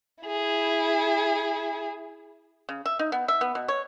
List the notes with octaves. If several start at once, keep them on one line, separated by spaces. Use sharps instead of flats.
E4 G#4
C#3
E5
D#4
B3
E5
B3
B2
C#5